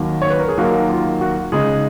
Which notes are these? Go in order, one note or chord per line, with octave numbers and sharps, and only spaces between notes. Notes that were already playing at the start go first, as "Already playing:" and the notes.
Already playing: D#2 D#3 F#3 A#3
C#5
B4
A#4
G#4
D#2 D#3 F#3 A#3 F#4
F4
F#4
C#3 G#3 D#4 G#4